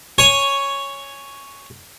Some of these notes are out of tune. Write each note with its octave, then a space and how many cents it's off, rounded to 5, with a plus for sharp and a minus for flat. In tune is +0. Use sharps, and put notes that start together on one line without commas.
C#5 +0 G#5 +0